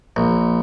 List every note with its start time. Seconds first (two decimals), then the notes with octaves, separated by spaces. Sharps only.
0.16 A#1